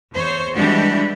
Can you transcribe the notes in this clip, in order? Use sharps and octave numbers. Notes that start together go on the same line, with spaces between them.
E2 C5 C#5
E3 G3 G#3 D4 F#4 G4